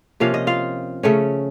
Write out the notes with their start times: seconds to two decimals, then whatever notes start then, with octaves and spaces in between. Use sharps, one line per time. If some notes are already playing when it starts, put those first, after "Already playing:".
0.20 C3 F3 A#3 C#4 F5
0.34 D#5
0.47 F4 F5
1.03 C#3 A3 C#4